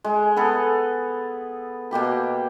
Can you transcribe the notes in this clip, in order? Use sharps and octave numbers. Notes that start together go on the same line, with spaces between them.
G#3
B3 G#4 A4 B4
B2 A#3 G4 B5